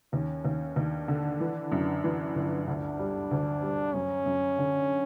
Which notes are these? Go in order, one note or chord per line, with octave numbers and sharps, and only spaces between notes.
D#2 C#4
D#2
D#2 D4
D3
E3
F#2
E3
G1
D2 D4
G3
D2
G3
F#2 C#4
F#2
D3